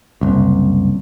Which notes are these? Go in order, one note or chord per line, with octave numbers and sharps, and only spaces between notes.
F#1 C2